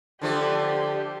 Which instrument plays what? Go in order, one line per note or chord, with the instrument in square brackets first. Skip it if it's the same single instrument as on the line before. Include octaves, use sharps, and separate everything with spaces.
[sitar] D3 F3 A3 [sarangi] G4